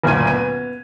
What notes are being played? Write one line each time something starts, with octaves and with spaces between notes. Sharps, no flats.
F#1 D2 A#2 G#6 D#7
B3 D#7